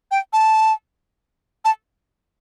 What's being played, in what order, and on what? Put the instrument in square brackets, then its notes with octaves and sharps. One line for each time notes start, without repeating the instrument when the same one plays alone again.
[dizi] G5
A5
A5